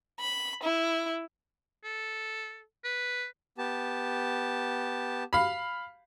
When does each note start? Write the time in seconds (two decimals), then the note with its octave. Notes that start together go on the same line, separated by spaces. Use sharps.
0.19 B5
0.63 E4
1.84 A4
2.84 B4
3.58 B3 G4 A5
5.33 F5 B5